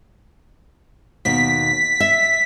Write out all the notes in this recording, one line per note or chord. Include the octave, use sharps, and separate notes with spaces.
D#2 B2 B6
E5